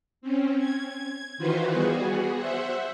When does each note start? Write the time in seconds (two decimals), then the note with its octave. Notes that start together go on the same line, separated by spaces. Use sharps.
0.21 C4 C#4
0.58 G#6
1.38 D#3 E3 F4 F#4 B4 C5
1.72 G3 B3 F#4 G#4
2.36 C5 E5 F#5